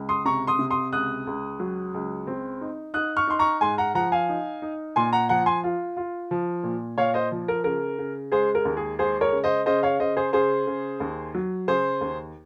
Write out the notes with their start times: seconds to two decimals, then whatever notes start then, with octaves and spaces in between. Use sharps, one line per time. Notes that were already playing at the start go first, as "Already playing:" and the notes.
Already playing: C#2
0.09 C6 D#6
0.25 C3 A#5 C#6
0.47 C6 D#6
0.59 C3
0.71 C6 D#6
0.92 C#2 D#6 F#6
1.27 C#2
1.60 F#3
1.94 C#2
2.27 C4
2.61 D#4
2.94 D#4 D#6 F#6
3.17 C#6 F6
3.27 D#4 C6
3.39 A#5 C#6
3.61 G#2 G#5 C6
3.78 F#5 A#5
3.95 F3 F#5 A#5
4.12 F5 G#5
4.29 D#4
4.62 D#4
4.96 A#2 G#5 C6
5.13 F#5 A#5
5.29 F3 F#5 A#5
5.46 G#5 C6
5.64 F4
5.97 F4
6.31 F3
6.63 A#2
6.98 A#2 C#5 F5
7.14 C5 D#5
7.32 F3
7.48 A#4
7.64 C#3 A#4
7.99 C#3
8.32 G#3 G#4 C5
8.55 A#4
8.65 D#2
8.77 G#4
8.99 G#3 G#4 C5
9.21 A#4 C#5
9.32 C#3
9.44 C5 D#5
9.66 C#3 C5 D#5
9.83 C#5 F5
10.00 C#3 C5 D#5
10.17 G#4 C5
10.33 C#3 G#4 C5
10.67 C#3
11.00 D#2
11.35 F#3
11.68 C#3 G#4 C5
12.01 D#2